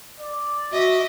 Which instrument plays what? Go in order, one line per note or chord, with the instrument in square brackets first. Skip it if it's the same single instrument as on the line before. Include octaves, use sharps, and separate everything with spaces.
[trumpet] D5
[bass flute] F#4 [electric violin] D#5 D6 [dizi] E5